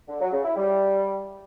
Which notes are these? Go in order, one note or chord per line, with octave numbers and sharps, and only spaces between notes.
D3
F#3
C#3
E4
G3